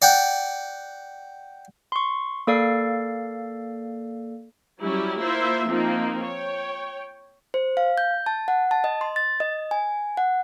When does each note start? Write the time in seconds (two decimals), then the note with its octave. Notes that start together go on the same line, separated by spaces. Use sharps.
0.02 D5 F#5 G5
1.92 C6 C#6
2.47 A#3 A4 D5 F5 C7
4.80 F#3 G3 C#4 E4 G4
5.19 A#3 E4 F4 C5 E5
5.66 F3 A#3 C4 D#4
6.22 C#5 G5
7.54 C5
7.77 F5
7.98 G6
8.26 A5
8.48 F#5
8.71 A5
8.84 D#5
9.01 C6
9.16 A6
9.40 D#5
9.71 G#5
10.17 F#5